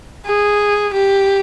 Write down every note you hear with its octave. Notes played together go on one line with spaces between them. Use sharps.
G#4
G4